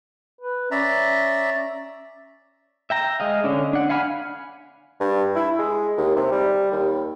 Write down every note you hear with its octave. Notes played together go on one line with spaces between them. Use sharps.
B4
C#4 D5 E5 A#5
E5 G5 A#5
G#3 D#5 F5
D3 C#4 D4
D4 F#5
F5 F#5 G#5 B5 F6
G2
E4
G#3
D#2
C3
G3
D#2